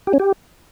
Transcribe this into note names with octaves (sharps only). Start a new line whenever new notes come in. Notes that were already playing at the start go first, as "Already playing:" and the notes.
G4
C#4
G4